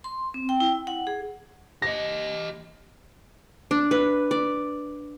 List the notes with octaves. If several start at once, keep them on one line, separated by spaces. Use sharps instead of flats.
C6
C4
G5
E4
F#5
G#4
G4 D#5 A#6
D4
B4
D5